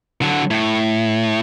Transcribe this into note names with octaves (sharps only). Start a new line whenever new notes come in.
D3 F#3
A2